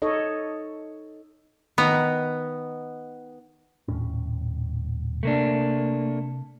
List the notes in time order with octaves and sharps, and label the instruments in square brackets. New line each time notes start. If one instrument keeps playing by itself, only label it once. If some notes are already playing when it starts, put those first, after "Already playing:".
[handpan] D#4 A4 C#5 D#5
[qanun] D#3 A#5 [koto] B3
[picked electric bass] D#1 A2 C#4
[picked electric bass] C3 [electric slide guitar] A3 A#3 D4